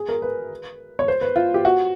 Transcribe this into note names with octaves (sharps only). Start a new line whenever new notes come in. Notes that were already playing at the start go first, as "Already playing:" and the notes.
Already playing: G#4
A#4
B4
C#5
C5
B4
F4
G4
F#4